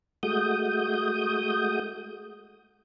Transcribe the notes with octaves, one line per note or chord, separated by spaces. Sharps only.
G#3 A3 F#4 D#6 G6